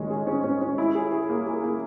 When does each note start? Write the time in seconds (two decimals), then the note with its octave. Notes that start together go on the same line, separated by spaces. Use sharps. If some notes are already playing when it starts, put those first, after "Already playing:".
Already playing: D#3 G#3 C#4
0.10 G#4
0.27 C#4
0.44 C#4
0.61 C#4
0.78 E4
0.95 G#4
1.12 G#4
1.29 A#3
1.47 G#4
1.63 A#3